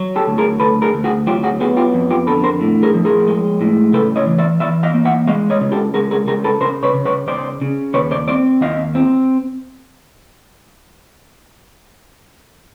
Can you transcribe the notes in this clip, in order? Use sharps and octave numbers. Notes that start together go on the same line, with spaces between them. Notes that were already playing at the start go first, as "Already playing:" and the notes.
Already playing: F#3
G4 A4
D2
G#4 A#4
D2 A4 B4
G#4 A#4
D2
F#4 G#4
F#3 F4 G4
F#4 G#4
B3 F#4 G#4
F4 G4
F2
F4 G4
D3 A4 B4
A#4 C5
A2
G#4 A#4
F3
G#4 A#4
G#3
A2
C#3 A4 B4
C#5 D#5
E3
D5 E5
E3 D5 E5
D#5 F5
A#3
E5 F#5
G#3 D#5 F5
C#5 D#5
C#3
G4 A4
G#3 G#4 A#4
G#4 A#4
C#3 G#4 A#4
A4 B4
C#3 A#4 C5
B4 C#5
C#3
B4 C#5
C#3 C5 D5
C#3
D#2 B4 C#5
C5 D5
C4 C5 D5
D#2 D#5 F5
C4